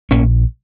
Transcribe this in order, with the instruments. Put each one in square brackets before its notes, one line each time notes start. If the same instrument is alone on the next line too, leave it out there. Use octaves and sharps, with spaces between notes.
[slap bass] A#1 A#3 C#4